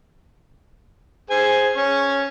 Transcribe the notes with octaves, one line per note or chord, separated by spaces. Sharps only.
G#4 C5 G#5
C#4 C#6